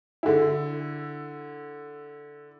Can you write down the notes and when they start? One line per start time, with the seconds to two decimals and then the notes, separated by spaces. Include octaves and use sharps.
0.23 D3 E4